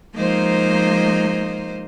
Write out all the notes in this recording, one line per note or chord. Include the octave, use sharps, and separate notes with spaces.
F3 G#3 A#3 D#4 C5 D#5